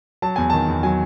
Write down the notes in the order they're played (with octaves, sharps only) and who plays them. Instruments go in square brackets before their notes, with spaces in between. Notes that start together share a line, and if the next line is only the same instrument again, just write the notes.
[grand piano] F#3 A5
E2 G#5
D#3 A5
E2
F#3 G#5